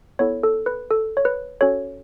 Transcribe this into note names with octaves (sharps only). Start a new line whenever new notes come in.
B3 E4 A4 C#5
A4
B4
A4
C#5
B4
C#4 F#4 A4 C#5